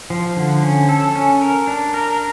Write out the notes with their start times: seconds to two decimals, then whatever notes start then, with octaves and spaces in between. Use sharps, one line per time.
0.10 F3
0.37 D3
0.63 C#4
0.89 A4
1.15 C#4
1.41 A#4
1.67 D4
1.94 A#4